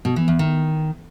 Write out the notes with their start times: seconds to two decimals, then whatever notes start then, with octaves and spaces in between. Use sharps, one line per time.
0.05 B2
0.16 E3
0.28 E2
0.39 D#3